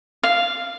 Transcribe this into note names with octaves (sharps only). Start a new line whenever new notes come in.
F5